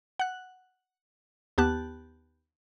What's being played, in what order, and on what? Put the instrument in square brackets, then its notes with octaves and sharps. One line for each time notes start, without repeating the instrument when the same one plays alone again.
[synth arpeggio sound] F#5 F#6
D#2 B3 G4 A5 F#6